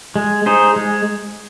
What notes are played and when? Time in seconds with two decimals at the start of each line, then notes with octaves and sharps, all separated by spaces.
0.16 G#3
0.46 D#4 G#4 C5
0.76 G#3